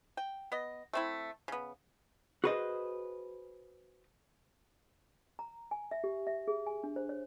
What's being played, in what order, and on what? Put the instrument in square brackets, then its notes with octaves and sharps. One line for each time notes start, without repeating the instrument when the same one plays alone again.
[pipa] G5
B3 D#5
A3 C4 E4
C#3 B3
[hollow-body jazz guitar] F#4 G#4 B4 C5 D#5
[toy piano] A#5
G#5
E5
G4
E5
G#4
G#5
D4
C5
C#5